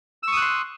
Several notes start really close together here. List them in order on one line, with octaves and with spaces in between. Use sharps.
E6 C#6 D#6 F#6 C6